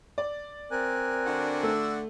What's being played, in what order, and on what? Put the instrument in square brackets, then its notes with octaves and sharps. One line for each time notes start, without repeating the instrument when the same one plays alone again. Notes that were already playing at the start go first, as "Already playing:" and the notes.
[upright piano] D5
[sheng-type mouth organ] C4 A#4 G#5 [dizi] F#6
[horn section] D3 D4 F#4
[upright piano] A3 [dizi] E6